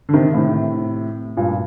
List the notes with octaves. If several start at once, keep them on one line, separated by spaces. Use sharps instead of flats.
D3
C3 D#3
A2 C3
G2 A#2